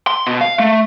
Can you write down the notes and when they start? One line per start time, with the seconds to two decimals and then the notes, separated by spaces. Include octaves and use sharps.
0.07 C6
0.27 B2
0.41 F5
0.59 A3